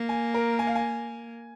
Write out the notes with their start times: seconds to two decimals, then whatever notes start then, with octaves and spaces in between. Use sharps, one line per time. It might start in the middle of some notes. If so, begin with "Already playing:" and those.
Already playing: A#3
0.09 G#5
0.34 A#4
0.59 G#5
0.67 F5
0.75 G#5